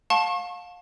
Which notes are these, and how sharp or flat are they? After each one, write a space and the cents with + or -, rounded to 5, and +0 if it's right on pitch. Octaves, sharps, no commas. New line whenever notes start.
F5 +30 A5 +0 C#6 -35